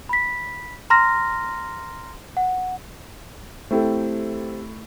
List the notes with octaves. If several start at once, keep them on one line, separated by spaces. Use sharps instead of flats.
B5 B6
A#5 C6 F6 A#6
F#5
A3 C4 E4 G4 A4